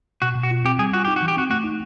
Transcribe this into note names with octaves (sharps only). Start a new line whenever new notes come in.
B2 F#4
B2
F#4
F4
C4 G4
G3 G#4
F4 F#4
D#4 G4
F#4
E3
G4
C4 F#4
A3 F#4
D#4